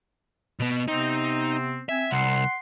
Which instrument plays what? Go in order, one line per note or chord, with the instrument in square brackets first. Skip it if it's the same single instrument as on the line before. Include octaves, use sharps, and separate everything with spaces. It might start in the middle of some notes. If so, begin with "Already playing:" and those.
[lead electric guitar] B2 B3
[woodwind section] C3 B3 C4 [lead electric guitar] D#4
[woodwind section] C4 G#5 [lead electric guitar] E5
[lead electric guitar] C2 [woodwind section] F#5 C6